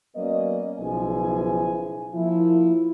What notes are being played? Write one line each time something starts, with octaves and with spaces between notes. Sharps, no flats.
F#3 A#3 B3 C#4 D5 D#5
B1 C#3 F3 E4 G#4 G#5
F3 A#3 E4